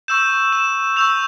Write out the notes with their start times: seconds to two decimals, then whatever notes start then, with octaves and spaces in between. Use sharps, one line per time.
0.08 C#6 E6 G6 E7
0.53 E7
0.96 C#6 E6 G6 F7